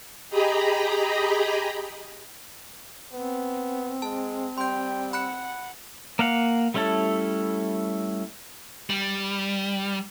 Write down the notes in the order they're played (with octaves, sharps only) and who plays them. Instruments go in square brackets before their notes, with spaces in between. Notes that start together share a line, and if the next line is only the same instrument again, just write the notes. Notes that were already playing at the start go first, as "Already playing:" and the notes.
[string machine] G4 G#4 D#5 A#5 B5
[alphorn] B3 [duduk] C4
[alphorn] G#3 [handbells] A5
[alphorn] G3 [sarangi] G5 [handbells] C6 G6
[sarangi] F#5 [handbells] B5 F#6 C#7
[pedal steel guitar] A#3 F5 F#5
G3 A3 C#4 E4 A4
[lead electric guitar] G3